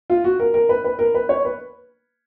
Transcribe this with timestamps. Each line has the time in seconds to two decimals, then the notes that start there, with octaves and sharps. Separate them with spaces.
0.10 F4
0.24 F#4
0.40 A#4
0.54 A#4
0.69 B4
0.84 B4
0.99 A#4
1.14 B4
1.29 C#5
1.45 B4